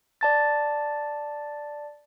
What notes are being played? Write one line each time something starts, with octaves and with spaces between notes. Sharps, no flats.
D5 A5 A6